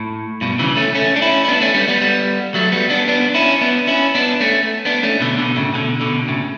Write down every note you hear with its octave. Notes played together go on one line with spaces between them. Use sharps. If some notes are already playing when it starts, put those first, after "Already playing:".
Already playing: A2
G2 B2
C#3 E3
A3 C#4
A3 C#4
D4
C#4 E4
E4
B3 D4
A3 C#4
G3 B3
G3 B3
G3 B3
F#3 A3
G3 B3
B3 D4
B3 D4
C#4 E4
B3 D4
C#4 E4
B3 D4
A3 C#4
B3 D4
A3 C#4
B2 D3
B2 D3
A2 C#3
B2 D3
B2 D3
A2 C#3